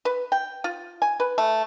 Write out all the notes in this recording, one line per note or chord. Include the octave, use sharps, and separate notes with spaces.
B4
G5
F4
G#5
B4
A3